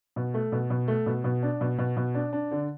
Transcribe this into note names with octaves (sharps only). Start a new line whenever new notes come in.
B2
A3
B2
B2
A3
B2
B2
D4
B2
B2
B2
D4
D4
D3